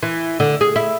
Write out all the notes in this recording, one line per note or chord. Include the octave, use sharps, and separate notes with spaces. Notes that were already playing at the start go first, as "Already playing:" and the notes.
E3
D3
G#4
E4